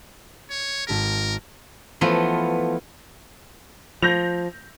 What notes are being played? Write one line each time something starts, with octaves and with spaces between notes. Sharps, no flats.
C#5
G#1 A4 A#4 B6
E3 F3 A3 B3 F4
F3 G6 A#6 F7